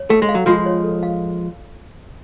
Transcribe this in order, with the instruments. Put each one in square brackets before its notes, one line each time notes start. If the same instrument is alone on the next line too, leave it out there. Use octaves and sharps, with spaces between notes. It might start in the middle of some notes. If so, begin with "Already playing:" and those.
Already playing: [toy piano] C#5
[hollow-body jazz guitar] A3 [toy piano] A4
[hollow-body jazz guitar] G#3
[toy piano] F5
[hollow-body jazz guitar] F#3
[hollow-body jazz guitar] F3 G#3 [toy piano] F4
[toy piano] C#5
A4
F5